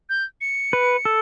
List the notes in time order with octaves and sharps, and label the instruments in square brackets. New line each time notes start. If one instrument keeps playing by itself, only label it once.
[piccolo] G6
C#7
[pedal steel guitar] B4
A4